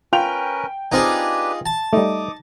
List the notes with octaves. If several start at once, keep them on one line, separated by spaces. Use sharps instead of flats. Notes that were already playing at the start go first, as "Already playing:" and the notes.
C#4 F4 A#4 B4 G5 F7
C4 D4 D#4 F4 G4 G#4 B4 G#5
A5
G3 A3 D#4 D6 D#6